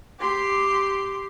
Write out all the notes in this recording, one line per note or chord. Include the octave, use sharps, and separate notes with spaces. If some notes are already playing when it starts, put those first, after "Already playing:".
G4 C6